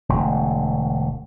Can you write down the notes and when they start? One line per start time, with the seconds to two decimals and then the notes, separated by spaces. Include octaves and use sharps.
0.09 E1 D2